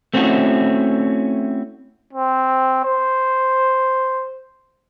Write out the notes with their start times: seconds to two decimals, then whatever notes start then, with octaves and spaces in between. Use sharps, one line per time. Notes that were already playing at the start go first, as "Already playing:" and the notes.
0.14 A3 C4 C#4 E4 F#4
2.13 C4
2.84 C5